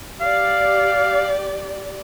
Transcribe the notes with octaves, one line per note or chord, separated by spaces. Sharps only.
G4 D5 F5